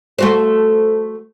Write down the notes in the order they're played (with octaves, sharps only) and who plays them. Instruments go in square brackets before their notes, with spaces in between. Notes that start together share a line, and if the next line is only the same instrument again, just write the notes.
[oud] A3 F#4 C5